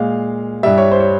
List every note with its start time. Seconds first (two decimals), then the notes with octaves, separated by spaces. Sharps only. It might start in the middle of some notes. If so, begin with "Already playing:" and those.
Already playing: A#2 G#3 F5
0.63 G2 G3 E5
0.78 C#5
0.92 C5
1.00 C#5